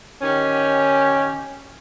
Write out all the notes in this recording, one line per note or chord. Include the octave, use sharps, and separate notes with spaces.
D#3 C#4 G4